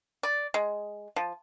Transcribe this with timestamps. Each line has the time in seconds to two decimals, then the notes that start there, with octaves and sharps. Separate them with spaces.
0.23 D5
0.54 G#3
1.16 F3